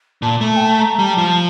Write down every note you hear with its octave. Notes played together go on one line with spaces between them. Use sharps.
A#2 A5
A3
G5
A5
A#5
G3 A5
F3